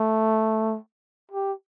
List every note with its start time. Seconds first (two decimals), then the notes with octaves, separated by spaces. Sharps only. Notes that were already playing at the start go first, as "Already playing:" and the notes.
Already playing: A3
1.31 G4